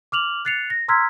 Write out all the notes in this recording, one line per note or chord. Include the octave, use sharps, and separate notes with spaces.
D6 F6 F7 F#7
F#6 A6 C7 C#7 F7
A#6
A#5 C6 E6 F6 G#6 B6